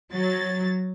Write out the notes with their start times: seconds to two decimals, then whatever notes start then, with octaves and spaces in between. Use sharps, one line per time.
0.14 F#3 A6